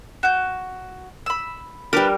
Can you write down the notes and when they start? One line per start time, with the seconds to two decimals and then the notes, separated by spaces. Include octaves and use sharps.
0.23 F#4 G6
1.26 B5 E6
1.93 G3 D4 G4 A#4 B4